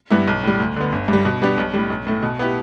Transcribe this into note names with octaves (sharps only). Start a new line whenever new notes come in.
G2 G3 B3 E4
B1
A2 G3
D2
D3 B3
G1
G2 G3
B2
G3 B3 D4 G4
B1
A2 G3
B1
A2 A3
B2
B3 E4 G4